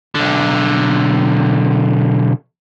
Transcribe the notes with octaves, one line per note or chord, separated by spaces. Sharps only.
B1 D3